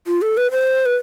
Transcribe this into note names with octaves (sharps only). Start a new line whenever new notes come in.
F4
A4
B4
C5
B4